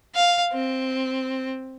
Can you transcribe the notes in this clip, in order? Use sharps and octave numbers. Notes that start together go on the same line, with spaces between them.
F5
C4